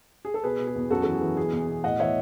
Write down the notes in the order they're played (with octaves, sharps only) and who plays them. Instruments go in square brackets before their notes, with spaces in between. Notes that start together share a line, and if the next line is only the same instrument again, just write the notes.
[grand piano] G#4
A4
B2 G#4 B4
B2
G#4
E2
F#2 F#4 A4
E3 A4
G#4
E3
B2 G#4
E2
B2
A2 D#5 F#5
E3 C#5 E5